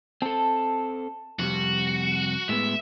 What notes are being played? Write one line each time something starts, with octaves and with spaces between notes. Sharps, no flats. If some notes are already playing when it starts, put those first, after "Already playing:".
C4 A4 A5
F2 C3 G3 F#4
A2 G#3 B3 E5